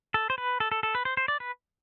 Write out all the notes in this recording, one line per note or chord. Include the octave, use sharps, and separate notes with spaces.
A4
C5
B4
A4
A4
A4
B4
C5
C5
D5
B4